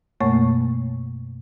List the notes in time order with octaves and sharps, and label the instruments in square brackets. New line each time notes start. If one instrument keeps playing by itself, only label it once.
[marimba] F#2 B2 A3 A#3 C#5 C#6